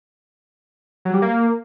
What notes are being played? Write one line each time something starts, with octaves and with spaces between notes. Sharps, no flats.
F#3
G3
A#3